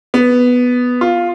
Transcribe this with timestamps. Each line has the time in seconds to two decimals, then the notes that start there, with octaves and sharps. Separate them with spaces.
0.14 B3
1.01 F4